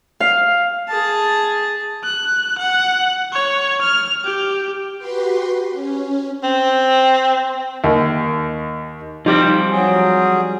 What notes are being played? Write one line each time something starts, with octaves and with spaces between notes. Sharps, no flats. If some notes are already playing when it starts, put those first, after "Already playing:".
F5
G#4 A5
F#6
F#5
C#5
F6
G4
F#4 G4 B4 C6
C#4
C4
D#2
F3 G3 C4 D#4 G4
F#3 G#4